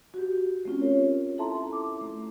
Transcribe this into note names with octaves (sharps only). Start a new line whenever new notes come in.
F#4 G4
A3 C4 C#4 F4
G4 A#4 C#5
E4 A4 E5 A5 A#5 C6
D6
A3